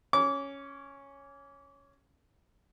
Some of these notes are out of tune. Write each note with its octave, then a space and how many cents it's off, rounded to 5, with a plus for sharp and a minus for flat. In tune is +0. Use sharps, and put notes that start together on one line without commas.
C#4 +0 D6 -30